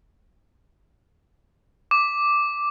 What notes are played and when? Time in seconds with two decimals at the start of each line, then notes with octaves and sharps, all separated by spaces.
1.91 D6